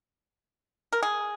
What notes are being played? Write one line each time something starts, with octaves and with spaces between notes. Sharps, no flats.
A#4
G#4